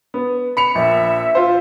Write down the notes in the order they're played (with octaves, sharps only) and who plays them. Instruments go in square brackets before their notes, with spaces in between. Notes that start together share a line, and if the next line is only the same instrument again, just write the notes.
[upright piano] B3
B5 C#7 F7
[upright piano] A#1 [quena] E5
[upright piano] F4 C5